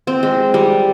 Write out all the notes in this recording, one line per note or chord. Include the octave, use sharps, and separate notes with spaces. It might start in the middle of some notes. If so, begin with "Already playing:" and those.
C4
G#3
G3